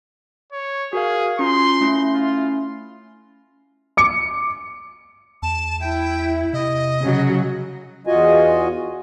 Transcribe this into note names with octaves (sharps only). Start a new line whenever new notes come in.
C#5
F#4 G#4 A#4 F5
C#4 F4 A#5 C6
A3 C#4 E4
F4
D6 C#7
E2 A5
E4 G5
C3 D#5
C#3 F#3 F#4
E2 F4 F#4 D#5 G#5